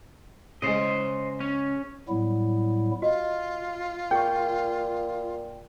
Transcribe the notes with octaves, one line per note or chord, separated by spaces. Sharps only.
C#3 G#3 C5 D#5
C#4
A2 F#3 G3 B3 E4
F4 F#4 D#5
A#2 G#4 G5 C#6